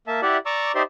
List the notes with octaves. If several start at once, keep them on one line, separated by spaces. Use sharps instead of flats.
A#3 E5 A5
E4 G4 D5 E5 F#5
D5 A#5 C#6 D6 E6
D#4 G4 C5 D5 E5 C6